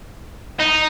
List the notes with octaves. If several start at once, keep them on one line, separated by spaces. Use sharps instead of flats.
D#4